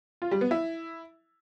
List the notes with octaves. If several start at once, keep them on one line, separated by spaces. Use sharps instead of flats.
F4
G3
B3
E4